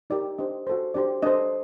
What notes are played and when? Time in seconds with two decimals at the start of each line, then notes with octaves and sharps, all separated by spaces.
0.10 D#4 G4 A#4 D5
0.38 D4 G4 C5 D#5
0.67 F#4 A4 C5
0.94 D4 G4 C5 D5
1.22 D4 A4 C5 D#5